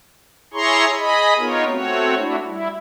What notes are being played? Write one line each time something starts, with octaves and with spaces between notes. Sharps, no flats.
E4 G#4 C#5 A#5 C6 C#6
G#4 D#5 B5
B3 D#4 F4 A#4 C#5
A3 C4 F#4 C#5
A3 D4 E4 F#4
G3 E4